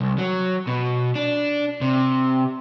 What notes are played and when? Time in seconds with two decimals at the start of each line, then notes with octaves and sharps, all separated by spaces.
0.01 C2
0.18 F#3
0.67 B2
1.15 D4
1.81 C3